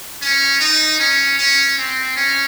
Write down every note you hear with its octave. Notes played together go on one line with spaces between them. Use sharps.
C#4
D#4
C#4
C#4
C4
C#4